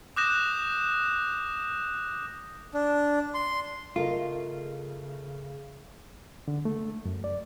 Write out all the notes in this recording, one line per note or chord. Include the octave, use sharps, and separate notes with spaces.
D6 D#6 F#6 G6 A#6 E7
D4
C6
C#3 A3 F4 A#4 D#5
D3
A3
F#2
D5